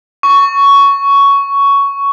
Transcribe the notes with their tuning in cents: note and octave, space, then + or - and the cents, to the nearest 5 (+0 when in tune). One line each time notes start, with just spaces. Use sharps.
C#6 +10